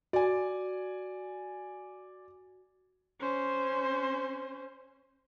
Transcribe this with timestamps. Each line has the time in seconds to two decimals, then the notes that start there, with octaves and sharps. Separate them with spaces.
0.13 F#4 D5 G#5
3.21 C#4 C5